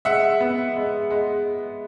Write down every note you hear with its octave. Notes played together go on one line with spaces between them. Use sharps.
G#3 E5 F#5
B3
G#3
G#3